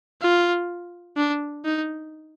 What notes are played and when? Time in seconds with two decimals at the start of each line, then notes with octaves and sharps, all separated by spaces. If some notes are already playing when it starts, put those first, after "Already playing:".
0.22 F4
1.17 D4
1.65 D#4